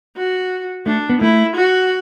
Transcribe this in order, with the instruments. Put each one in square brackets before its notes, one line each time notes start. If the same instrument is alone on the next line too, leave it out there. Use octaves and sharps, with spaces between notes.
[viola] F#4
[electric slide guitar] A3 [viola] D4
[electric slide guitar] B3
[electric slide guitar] A3 [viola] E4
[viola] F#4